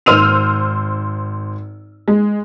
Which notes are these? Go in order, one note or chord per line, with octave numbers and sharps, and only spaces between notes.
G#1 C5 E6 F6 D#7 F7
G#3